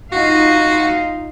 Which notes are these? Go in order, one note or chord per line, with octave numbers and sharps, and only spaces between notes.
D#4 F4 F#4 F5